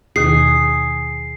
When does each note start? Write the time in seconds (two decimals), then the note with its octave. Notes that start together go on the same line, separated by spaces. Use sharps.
0.16 D#2 B2 D#3 G#4 C7